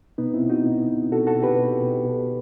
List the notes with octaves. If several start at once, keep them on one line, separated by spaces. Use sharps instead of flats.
B2 B3 D#4
C4 E4
B2
D#4 F#4
B2
B2
B2 F#4 A4
F#4 A4
B2
G4 B4
B2
B2
B2